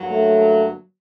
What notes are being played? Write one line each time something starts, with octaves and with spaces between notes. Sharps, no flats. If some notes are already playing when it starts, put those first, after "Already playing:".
Already playing: G2 D3 F#3 A#3
A3